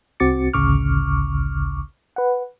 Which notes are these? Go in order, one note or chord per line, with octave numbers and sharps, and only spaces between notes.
C2 C4 F#4 D6 A6 C#7
A1 D2 C#3 C#6 D6 F6
B4 F#5